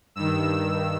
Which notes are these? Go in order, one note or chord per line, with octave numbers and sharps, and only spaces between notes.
G2 D#3 E6